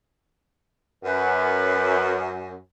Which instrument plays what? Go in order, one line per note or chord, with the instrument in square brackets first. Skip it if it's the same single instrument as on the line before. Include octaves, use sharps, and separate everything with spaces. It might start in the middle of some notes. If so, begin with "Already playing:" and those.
[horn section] F#2 [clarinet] B4